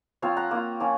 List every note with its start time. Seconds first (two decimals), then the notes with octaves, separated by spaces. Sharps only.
0.22 F3 C4 F4 C#5 F5
0.37 F#5 A#5
0.51 A#3 F4
0.80 F3 A#3 C#4 F4